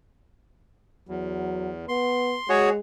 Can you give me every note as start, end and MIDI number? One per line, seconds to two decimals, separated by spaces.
1.09 1.86 40
1.09 1.72 54
1.89 2.37 59
1.89 2.49 84
2.49 2.79 56
2.49 2.70 66
2.49 2.70 68
2.49 2.70 73